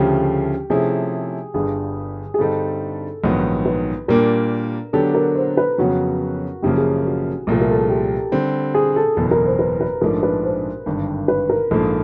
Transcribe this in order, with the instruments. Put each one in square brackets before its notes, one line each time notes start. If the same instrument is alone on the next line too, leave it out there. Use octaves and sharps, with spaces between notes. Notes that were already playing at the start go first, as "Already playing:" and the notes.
Already playing: [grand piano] D2 C#3 F3 A3 [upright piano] G4
[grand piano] C3 F3 A3 C#4 E4 [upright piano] G#4
[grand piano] G1 G2 D3 G3 [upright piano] G#4
[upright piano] G#4
[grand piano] G2 D3 G3 C4 D#4 [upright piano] A4
[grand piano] A#1 G#2 D#3 F#3 B3
[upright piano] B4
[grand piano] A#2 G3 A#3 D4 [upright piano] A#4
[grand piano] D3 F#3 B3 D4 G4 [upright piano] A4
[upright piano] A#4
C5
B4
[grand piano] F2 C#3 F#3 B3 [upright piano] F#4
[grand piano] F#1 F#2 C#3 F3 A#3 [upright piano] G4
[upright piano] G#4
F#4
[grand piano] C2 A#2 F3 A3
[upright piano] A#4
A4
G#4
G4
[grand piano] D3 G3 C4
[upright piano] G#4
A4
[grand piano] F#1 E2 B2 [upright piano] A4
[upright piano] A#4
C5
B4
B4
[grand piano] A#1 G#2 F3 A3 D4 [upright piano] A#4
[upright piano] B4
C5
[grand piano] G#1 G2 D3
[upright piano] B4
A#4
[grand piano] A#1 G#2 F3 A#3 [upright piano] A4